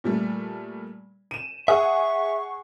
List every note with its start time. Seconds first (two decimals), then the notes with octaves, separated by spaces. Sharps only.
0.04 A#2 G3 A3
1.31 D#7 E7
1.68 G#4 E5 F#5 C#6 D#6